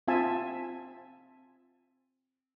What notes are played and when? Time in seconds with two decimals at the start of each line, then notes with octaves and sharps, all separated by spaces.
0.08 C4 F4 E5 G#5 A5